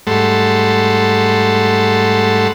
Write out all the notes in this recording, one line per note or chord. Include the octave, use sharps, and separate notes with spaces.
G#2 G3 A3 A4 F#5 C6